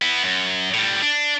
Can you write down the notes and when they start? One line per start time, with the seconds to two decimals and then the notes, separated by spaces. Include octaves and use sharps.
0.02 B3 E4
0.23 F#2
0.74 A2 G3
1.02 D4